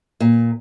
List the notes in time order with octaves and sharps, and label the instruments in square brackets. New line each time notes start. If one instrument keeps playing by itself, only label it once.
[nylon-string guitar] A#2